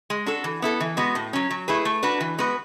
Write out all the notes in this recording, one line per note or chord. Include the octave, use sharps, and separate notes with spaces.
G#3
D4 F#4 A4
E3
B3 E4 A4
E3
G#3 B3 F#4
A2
F#3 C#4
F#3
A3 E4 G#4 B4
A3
D4 F#4 B4
E3
G#3 B3 F#4 B4